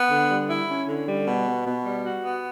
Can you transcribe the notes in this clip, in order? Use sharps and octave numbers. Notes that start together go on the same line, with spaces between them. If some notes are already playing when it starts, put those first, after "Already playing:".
Already playing: B3
D3
G3
E4
C#4
D3
G3
B2
B3
B2
G3
F#4
B3